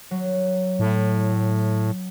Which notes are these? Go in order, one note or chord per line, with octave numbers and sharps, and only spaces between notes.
F#3
A2